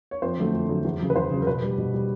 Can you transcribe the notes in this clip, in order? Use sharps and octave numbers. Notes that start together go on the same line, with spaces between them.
C#5
F2 C5
D3 F#3 A3
F2
D3 F#3 A3
E2
C#3 F#3
B4
E2 C5
C#3 F#3
A#4
B2 B4
G3
B2
G3